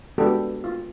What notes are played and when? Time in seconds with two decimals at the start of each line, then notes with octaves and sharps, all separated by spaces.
0.18 G#3 B3 D4 F#4 G4 A4
0.64 F4